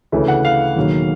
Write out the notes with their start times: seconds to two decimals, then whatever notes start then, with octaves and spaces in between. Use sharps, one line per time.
0.12 D2 C#3 E3 A3
0.28 F#5
0.45 F5
0.76 E1 D#2 D#3 F#3 A#3